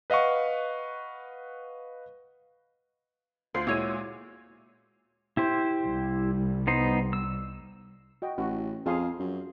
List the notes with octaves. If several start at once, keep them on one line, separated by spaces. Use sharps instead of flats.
B4 D#5 F5 F#5 C#6
D2 F4 C5 C7
A#2 G#3 E4 F#4 C#5 D#7
E4 G4 C5
C2 G3
B3 D#4 C5
E6
F#4 D#5 G5
A1 F#4
F2 G#4 F5 C6
F#2